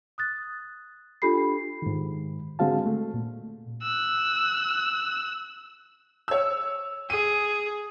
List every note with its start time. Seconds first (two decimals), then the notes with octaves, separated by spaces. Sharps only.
0.18 D#6 F#6 A6
1.22 D4 F4 G4 A4 B5 C7
1.82 G#2 D#3
2.59 D3 G#3 C4 F#4 F5 A5
2.86 A3
3.14 A#2
3.82 E6 F#6
6.28 C#5 E6
7.10 G#4 D#7